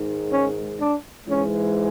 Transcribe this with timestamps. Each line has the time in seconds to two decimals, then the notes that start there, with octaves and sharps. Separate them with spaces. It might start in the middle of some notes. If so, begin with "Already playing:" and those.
Already playing: G#2 D#3 G#3
0.31 C#4
0.79 D4
1.27 G#2 E3 G#3 C#4